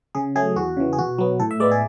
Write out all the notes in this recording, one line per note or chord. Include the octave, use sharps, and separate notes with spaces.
C#3 G#4
F#3 A3 G#4
E2 F#4
C#3 E3
G#4
B2 F#4
F#3 B3
A2 A4
E5
G#3 B3 D5
G#4